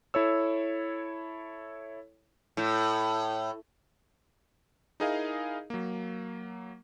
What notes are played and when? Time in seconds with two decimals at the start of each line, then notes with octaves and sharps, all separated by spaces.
0.14 E4 A4 C#5 E6
2.57 A2
5.00 D#4 E4 G#4 A#4 D#5 F5
5.70 F#3 A#3